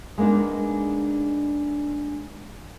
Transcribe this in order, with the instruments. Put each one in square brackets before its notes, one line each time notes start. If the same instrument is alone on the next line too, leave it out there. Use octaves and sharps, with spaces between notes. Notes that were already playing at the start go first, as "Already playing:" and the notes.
[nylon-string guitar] G#3 A#3 B3 D4 D#4